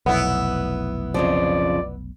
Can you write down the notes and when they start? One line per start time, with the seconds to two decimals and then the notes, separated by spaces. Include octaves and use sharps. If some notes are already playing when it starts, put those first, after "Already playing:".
0.06 F1 B1 B3 E4
1.14 F2 C#3 F3 D5